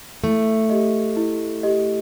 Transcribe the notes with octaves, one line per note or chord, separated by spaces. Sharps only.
A3 E4
G4 D#5
E4
G4 D#5